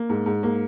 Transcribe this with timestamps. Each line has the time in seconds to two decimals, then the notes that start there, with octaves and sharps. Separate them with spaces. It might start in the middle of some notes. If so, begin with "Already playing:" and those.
Already playing: A#3
0.09 G#2
0.26 G#2
0.43 A#3